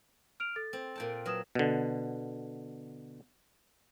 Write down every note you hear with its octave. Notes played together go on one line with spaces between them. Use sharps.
F6 D7 F7
A4 A6
C4
A#2 G5 A5
F#3 B4 D#6 E7
B2 D3